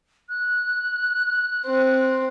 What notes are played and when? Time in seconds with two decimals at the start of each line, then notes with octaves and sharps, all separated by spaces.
0.29 F#6
1.66 C4